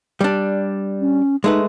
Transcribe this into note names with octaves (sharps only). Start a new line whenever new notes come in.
G3 D4
C#4
G#3 A3 D#4 B4